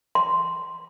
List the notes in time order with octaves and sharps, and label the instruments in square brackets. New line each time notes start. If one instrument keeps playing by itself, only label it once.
[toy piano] C6